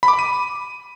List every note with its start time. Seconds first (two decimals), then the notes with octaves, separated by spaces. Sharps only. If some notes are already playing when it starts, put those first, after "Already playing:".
0.03 B5
0.08 D6
0.13 B5
0.19 D#7